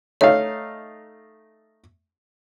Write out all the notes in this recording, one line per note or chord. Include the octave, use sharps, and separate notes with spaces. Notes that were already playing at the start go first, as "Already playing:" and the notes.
A3 D#4 C#5 F5